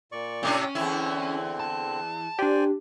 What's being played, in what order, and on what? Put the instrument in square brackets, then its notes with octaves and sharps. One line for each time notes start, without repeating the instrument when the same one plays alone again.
[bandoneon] A#2 D5 C#6
[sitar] A2 C3 D4 [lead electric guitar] C#4
[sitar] E2 E4 [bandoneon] D3 C4
[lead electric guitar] A5
[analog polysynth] D4 G4 [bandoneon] C5 D5 G#5